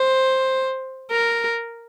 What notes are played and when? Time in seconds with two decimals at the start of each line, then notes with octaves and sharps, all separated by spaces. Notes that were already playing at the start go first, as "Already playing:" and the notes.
Already playing: C5
1.11 A#4